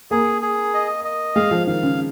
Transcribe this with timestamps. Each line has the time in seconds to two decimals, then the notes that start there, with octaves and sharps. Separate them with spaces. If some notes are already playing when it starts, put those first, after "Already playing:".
0.11 A#3 G#4
0.42 G#4
0.74 D#5
1.04 D#5
1.35 G#3 F5
1.51 F3
1.67 D#3 F5
1.83 C#3